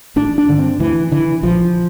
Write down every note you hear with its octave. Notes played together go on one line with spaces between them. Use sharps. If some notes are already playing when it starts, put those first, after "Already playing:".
A1 D4
D4
G2 D3
C4
D2 E3
D3 E3
A#1 F3